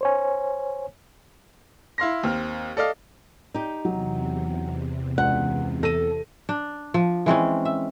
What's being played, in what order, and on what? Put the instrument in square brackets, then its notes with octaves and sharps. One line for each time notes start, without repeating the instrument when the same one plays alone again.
[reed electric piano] C5 C#5 G#5
[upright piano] E4 F5 C6 A#6
D#2 C4 F6
A4 D5 D#5 F5
[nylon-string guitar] D#4 G4
[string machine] E2 C3 [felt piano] F#3
[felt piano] C#2 [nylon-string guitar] F#5
[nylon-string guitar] A4 [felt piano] A#6 D#7
[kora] D4
F3
E3 G#3 C4 C#4
E5